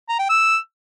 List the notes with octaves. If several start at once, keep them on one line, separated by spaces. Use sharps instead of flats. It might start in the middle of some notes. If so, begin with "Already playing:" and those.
A#5
G5
E6